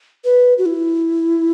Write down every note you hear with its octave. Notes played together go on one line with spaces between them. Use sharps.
B4
F#4
E4